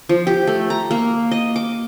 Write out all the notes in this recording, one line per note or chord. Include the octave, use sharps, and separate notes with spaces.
F3
G4
A3
A#5
A#3
D#5
D6